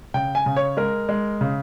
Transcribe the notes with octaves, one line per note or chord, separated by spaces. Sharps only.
C#3 G5
G#5
C#3
C#5
G#3 A#4
G#3
C#3